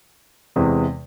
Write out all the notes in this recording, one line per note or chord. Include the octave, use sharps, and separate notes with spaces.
E2 C3 E3 G#3